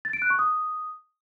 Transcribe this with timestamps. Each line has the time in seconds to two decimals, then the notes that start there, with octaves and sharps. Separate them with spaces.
0.05 A6
0.13 D7
0.22 F#6
0.30 C#6
0.39 D#6